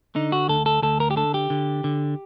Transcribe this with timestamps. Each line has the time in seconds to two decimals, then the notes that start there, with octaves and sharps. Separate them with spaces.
0.15 D3 D#4
0.32 F#4
0.49 D2 A4
0.66 A4
0.82 D2 A4
1.00 A#4
1.11 G4
1.16 D3 A4
1.34 G4
1.50 D3
1.84 D3